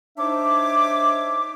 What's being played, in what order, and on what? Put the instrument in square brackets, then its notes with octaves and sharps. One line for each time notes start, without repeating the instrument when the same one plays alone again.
[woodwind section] D4 D#4 C5 C#5 E5 D6